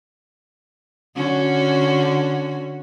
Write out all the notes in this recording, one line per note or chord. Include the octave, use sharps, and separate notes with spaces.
D3 C#4 F#4